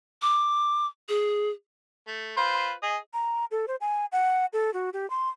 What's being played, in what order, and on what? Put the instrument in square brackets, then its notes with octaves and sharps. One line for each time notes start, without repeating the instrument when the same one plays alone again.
[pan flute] D6
G#4
[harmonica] A3
F4 B4 C5
G#4 D#5
[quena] A#5
A4
C5
G#5
F#5
A4
F#4
G4
C6